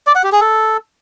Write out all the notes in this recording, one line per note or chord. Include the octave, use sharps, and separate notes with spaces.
D5
F#5
G4
G#4
A4